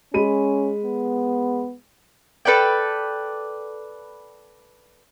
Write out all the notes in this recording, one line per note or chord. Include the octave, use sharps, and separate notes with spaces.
G#3 C#4 B5 D#7
B3
A4 B4 D5 G5